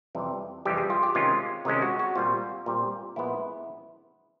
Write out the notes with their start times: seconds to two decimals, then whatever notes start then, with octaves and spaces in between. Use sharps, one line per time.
0.15 F2 C3 E3 G3
0.65 F2 C3 E3 G3 G4
0.78 G#4
0.90 F4
1.03 G4
1.15 C3 D#3 G#3 C#4 F4
1.65 C3 D#3 G#3 C#4
1.82 F#4
1.99 F#4
2.15 A#2 G3 C4 F4
2.66 A#2 G3 C4
3.16 A#2 F3 G#3 B3 E4